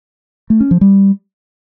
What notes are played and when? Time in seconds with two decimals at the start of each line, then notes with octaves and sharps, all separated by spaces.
0.50 A3
0.60 C#4
0.71 F3
0.81 G3